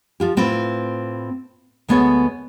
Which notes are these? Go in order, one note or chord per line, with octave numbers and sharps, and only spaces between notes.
F3 F4 G4
A2 C4 E4 F4 B4
D2 G#3 B3 A4 C#5